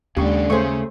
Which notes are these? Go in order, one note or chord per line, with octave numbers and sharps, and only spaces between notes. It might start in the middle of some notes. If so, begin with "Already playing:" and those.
D#2 C#3 G#3 D4 G4 C#6
C#3 A3 G#4 C5 C#5 C#6